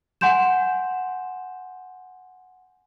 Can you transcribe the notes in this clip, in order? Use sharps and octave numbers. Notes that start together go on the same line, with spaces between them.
F#5 G#5 C6 G6 E7